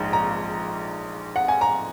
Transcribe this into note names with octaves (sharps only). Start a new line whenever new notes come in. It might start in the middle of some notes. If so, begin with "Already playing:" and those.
Already playing: A#1 G#2
A#5
F#5
G#5
A#5